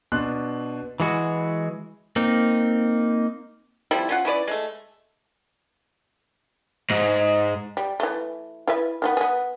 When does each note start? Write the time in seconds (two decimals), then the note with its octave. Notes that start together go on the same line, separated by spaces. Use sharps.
0.12 B2 D4 C6 F#6
1.00 E3 G#3 F#4
2.16 A#3 C4 D#4
3.91 F3 G3 C4 E4
4.09 C#4 F4 F#5
4.25 C#4 E4 B4 D5
4.48 G#3 A3
6.91 G#2
7.77 G3
8.00 E3 A3
8.68 E4 B4 E5
9.02 D#3 A3 B3
9.17 B3 G#4